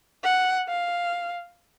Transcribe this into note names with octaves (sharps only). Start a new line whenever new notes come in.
F#5
F5